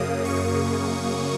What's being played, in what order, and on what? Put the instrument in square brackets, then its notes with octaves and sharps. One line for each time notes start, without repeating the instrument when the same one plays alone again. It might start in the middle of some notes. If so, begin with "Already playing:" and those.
Already playing: [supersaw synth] F#2 C#3 A#3 D#6
C#6